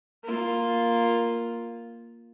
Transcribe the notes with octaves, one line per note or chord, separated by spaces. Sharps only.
A#3 F4